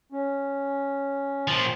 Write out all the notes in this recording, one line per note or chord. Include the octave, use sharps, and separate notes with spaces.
C#4
A#2 F3